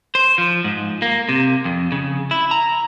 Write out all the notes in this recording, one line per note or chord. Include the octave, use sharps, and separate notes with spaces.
C5
F3
G#2
A#3
C3
F2
C#3
E4
A#5